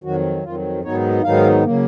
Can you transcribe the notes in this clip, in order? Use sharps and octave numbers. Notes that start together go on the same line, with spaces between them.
F2 D#3 F#3 F#4
F2 D#3 F#3 F4
G#2 D#3 F#3 B3 D#4 C#5
G#2 D#3 F#3 B3 D#4 F5
C#3 F#3 A#3